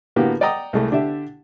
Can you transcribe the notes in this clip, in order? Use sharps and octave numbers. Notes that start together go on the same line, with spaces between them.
A2 D3 A#3 B3 F#4 G4
D5 D#5 F#5 G5 A#5 D#6
C2 G#3 A3
D3 D4 G4 E5